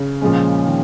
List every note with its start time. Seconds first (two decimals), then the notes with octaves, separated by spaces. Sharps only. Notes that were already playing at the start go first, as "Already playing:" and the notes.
Already playing: C#3
0.21 A#2 F3 G#3 C#4
0.67 D#3